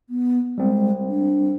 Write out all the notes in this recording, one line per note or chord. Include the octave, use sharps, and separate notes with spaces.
B3
G3 G#3 C4
D4